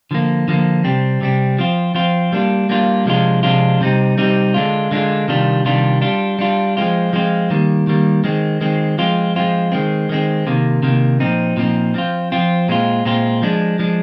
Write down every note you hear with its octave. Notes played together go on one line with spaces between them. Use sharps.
D3 F3 A#3
D3 F3 A#3
C3 G3 C4
C3 G3 C4
F3 C4 F4
F3 C4 F4
G3 A#3 D4 F4
G3 A#3 D4 F4
C3 F3 G#3 D4 F4
C3 F3 G#3 D4 F4
C3 G3 C4 D#4
C3 G3 C4 D#4
D3 G#3 D4 F4
D3 G#3 D4 F4
C3 D#3 G3 D4 F4
C3 D#3 G3 D4 F4
G3 D4 F4
G3 D4 F4
F3 G#3 C4 F4
F3 G#3 C4 F4
D#3 G3 A#3
D#3 G3 A#3
D#3 G#3 C4
D#3 G#3 C4
F3 G#3 C4 F4
F3 G#3 C4 F4
D#3 G#3 C4
D#3 G#3 C4
C3 D#3 A#3
C3 D#3 A#3
A#2 F3 C4 D#4
A#2 F3 C4 D#4
F3 C4 F4
F3 C4 F4
A#2 G#3 C4 F4
A#2 G#3 C4 F4
F3 G#3 D4
F3 G#3 D4